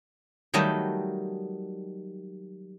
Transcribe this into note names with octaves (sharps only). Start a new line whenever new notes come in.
D#3 F#3 G3 A3 D#5